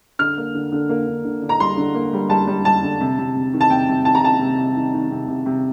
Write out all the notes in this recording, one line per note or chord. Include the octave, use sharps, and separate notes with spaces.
D3 F6
A#3
D3
D3
A#3
D3
D3
D3
A#5
G3 C6
D3
A#3
G3
G3 A5
G3
G3 A5
D3
C3
C3
C3
D#3
A5
C3 G5
C3
D#3 A5
A#5
C3 A5
C3
C3
D#3
D#3
C3
C3
C3